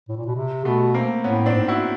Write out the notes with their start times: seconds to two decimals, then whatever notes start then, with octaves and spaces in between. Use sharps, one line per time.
0.08 A2
0.17 A#2
0.26 B2
0.35 C3
0.65 B2 A3 B3
0.94 A#3 C4
1.23 A2 B3 C#4
1.46 C4 D4
1.53 G#2
1.68 E4 F#4